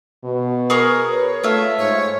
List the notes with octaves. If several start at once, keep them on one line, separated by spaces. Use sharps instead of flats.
B2
G#4 A#4 C#6
B4 C#5
A3 F4 E5
G#2 C#5